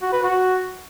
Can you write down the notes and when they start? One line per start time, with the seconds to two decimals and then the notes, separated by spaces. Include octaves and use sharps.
0.02 F#4
0.12 B4
0.23 F#4